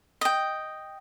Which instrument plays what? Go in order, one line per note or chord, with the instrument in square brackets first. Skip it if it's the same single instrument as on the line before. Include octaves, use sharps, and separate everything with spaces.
[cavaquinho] D#5 G5